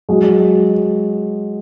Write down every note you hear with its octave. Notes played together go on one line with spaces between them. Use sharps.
F#3 G#3